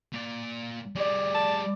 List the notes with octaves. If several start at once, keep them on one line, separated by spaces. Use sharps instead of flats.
A#2 D5
G3 G#4 D5
A5